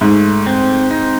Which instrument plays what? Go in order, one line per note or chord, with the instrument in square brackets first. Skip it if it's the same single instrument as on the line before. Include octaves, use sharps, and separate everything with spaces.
[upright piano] G#2 [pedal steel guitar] A3
[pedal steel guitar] C4
D#4